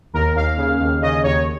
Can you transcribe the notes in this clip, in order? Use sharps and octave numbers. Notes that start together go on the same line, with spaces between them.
D#2 A#4
D#2 F5
C#3
D#2
C#3 D#5
D#2 C#5